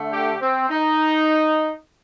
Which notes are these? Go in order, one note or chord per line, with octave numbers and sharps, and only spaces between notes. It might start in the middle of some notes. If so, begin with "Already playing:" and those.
Already playing: D3 A3
G4
C4
D#4